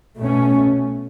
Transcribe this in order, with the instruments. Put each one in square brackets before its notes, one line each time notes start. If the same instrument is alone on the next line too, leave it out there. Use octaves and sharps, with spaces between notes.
[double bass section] B2 A3 C#4